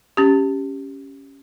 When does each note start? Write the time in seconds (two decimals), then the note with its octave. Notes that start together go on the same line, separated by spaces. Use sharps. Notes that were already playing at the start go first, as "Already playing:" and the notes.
0.17 C#4 G4